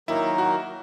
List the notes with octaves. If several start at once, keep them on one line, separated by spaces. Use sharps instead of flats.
D#3 F#3 A#3 D#4 E4 A#4
F#4